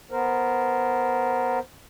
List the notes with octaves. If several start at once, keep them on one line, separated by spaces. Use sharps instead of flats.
B3 A#4 C5